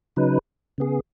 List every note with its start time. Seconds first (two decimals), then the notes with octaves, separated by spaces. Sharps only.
0.16 C#3 F#3 D#4 B4
0.78 C#3 B3 G#4